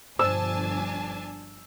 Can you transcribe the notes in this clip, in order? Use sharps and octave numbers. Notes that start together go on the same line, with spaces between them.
G1 B2 F3 D4 C5 G#5 A5 E6